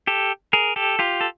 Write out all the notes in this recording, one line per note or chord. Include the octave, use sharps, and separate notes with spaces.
G4 A4
G#4 A#4
G4 A4
F4 G4
A4